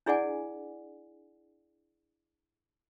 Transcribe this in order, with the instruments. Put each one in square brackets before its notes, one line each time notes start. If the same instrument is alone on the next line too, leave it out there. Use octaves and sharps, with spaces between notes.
[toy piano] D4 E4 G#4 D5 F#5 G#5